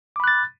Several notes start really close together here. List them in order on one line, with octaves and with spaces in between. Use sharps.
D6 B5 F#6 A6